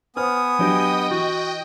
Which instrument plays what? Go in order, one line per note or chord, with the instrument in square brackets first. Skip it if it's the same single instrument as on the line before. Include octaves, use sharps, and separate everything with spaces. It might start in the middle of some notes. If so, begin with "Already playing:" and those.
[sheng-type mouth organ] B3 D#6 [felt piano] B4 C5 F6 [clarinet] G#5
[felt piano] F#3 D4 G4 [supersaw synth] D#5 G5
[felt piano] E3 [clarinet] F#4